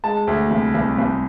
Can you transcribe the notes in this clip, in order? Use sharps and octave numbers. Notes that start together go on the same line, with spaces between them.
G#3 A5
D2
C2
C2
C2